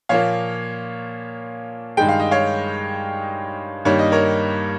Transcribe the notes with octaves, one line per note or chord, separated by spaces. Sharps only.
A#2 F3 A#3 C#5 F5
G2 D#3 G#3 G5
F5
D#5
C#5 F5
G2 D#3 G3 A#3 C#5
D#5
A#4 C#5